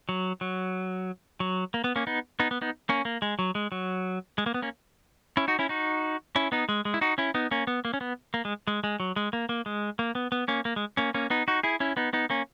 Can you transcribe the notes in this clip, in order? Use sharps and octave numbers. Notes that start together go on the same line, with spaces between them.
F#3
F#3
F#3
A#3
B3
A#3 C#4
B3 D#4
B3 D#4
B3
B3 D#4
A#3 C#4
A#3
G#3
F#3
G#3
F#3
G#3
A#3
B3
A#3 C#4
C#4 E4
D#4 F#4
C#4 E4
D#4 F#4
C#4 E4
B3 D#4
G#3
G#3
E4
D#4 F#4
C#4 E4
B3 D#4
A#3 C#4
B3
A#3
C#4
B3
A#3
G#3
G#3
G#3
F#3
G#3
A#3
A#3
G#3
A#3
B3
B3
A#3 C#4
A#3
G#3
A#3 C#4
A#3 C#4
B3 D#4
D#4 F#4
E4 G#4
C#4 E4
B3 D#4
B3 D#4
A#3 C#4